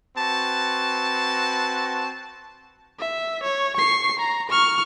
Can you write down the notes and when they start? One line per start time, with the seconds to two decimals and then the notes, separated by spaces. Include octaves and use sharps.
0.16 C4 F#4 B4 A5
2.99 E5
3.43 C#5
3.77 C#6 C7
4.19 A#5
4.50 C#6 F6